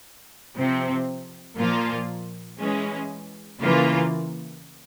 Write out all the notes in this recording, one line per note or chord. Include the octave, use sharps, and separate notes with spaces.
C3 F3 C4
A#2 F3 A#3 F4
E3 G#3 C#4
C#3 E3 A#3 F4